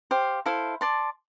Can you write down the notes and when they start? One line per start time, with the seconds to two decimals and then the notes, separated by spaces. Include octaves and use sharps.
0.11 G4 C5 F5
0.46 E4 A4 C5 F5
0.81 D5 A5 C6